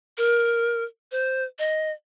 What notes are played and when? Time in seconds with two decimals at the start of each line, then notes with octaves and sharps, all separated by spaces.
0.18 A#4
1.12 C5
1.59 D#5